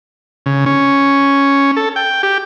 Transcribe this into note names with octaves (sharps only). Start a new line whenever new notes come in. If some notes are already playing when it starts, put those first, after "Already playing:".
C#3
C#4
A4
G5
G4